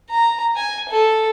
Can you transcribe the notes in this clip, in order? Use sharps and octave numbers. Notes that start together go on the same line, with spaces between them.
A#5
G#5
A4